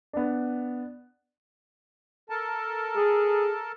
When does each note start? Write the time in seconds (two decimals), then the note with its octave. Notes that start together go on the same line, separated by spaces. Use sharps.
0.13 B3 D4
2.30 A4 A#4 A5
2.96 G#4